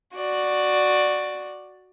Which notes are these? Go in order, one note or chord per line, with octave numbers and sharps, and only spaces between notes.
F#4 D5